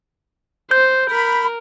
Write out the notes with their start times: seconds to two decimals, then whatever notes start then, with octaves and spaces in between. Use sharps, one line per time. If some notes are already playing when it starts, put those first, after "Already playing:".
0.71 C5 G6
1.10 A#4 B5